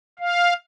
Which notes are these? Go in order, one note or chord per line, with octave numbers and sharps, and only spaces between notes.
F5